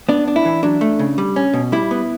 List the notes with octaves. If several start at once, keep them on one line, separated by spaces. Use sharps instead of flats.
B3 D4
D4
E4
E3
F#3 D4
A3
C#3
G3
C#4
B2
G3 E4
B3